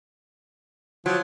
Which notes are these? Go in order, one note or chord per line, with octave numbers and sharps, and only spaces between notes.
F3 F#3